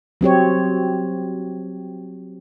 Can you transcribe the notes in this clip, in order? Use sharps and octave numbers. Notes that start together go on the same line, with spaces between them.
F#3 C4 G4 C#5